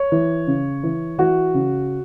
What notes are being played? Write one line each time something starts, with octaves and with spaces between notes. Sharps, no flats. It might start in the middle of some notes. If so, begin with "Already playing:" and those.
Already playing: C#5
E3
C#3
E3
E3 F#4
C#3